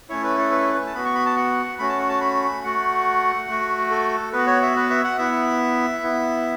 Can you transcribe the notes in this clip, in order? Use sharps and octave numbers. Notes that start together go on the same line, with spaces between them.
A3 C#4 E4 C#5
B4
A4
B4
B4
A5
B3 F#4 B5
C#6
B5
A5
F#5
A3 C#4 F#4 B5
A5
F#5
A5
B5
A3 F#4 F#5
A3 F#4
A4
B3 F#4 B4
C#5
E5
B4
E5
F#5
B3 E4 E5
B3 E4